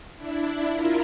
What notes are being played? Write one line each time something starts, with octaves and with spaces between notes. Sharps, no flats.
D4 E4
E4 F4 A#4